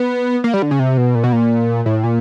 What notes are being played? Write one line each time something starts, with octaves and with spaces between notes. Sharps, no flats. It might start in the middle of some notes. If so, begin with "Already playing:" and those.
Already playing: B3
A#3
G3
D3
C#3
C3
B2
A#2
B2
A#2
A2
A#2